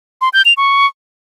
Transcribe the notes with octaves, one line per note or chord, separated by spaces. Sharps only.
C6
G6
F7
C#6